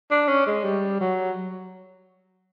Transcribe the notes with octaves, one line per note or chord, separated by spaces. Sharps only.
D4
C#4
G#3
G3
F#3